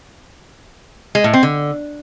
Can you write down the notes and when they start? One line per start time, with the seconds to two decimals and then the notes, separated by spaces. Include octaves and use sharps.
1.15 G#3
1.24 A2
1.33 C4
1.43 D3